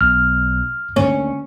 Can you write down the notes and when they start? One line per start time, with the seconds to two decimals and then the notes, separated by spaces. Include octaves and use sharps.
0.01 B1 F6
0.96 D3 A3 A#3 C#4